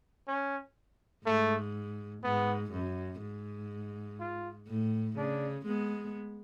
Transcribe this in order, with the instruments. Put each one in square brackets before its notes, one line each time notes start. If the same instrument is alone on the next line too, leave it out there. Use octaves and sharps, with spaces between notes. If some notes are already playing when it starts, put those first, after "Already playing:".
[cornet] C#4
[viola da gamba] G#2 [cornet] A3
[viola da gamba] G#2 [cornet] B3
[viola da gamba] F#2
G#2
[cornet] F4
[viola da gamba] A2
[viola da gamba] C#3 [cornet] D4
[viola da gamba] G#3 B3